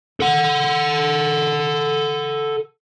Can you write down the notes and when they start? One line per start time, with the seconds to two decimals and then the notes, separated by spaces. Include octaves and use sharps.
0.21 A4 F#5